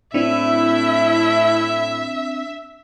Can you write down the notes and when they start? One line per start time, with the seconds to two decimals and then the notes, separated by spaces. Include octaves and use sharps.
0.14 A2 C4 D4 E4 E5